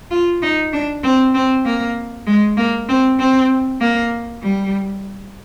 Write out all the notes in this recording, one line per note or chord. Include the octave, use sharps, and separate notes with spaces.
F4
D#4
D4
C4
C4
A#3
G#3
A#3
C4
C4
A#3
G3